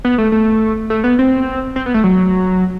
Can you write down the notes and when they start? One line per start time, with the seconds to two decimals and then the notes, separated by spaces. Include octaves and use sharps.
0.05 B3
0.18 A3
0.32 A3
0.90 A3
1.04 B3
1.19 C4
1.76 C4
1.86 B3
1.94 A3
2.04 F#3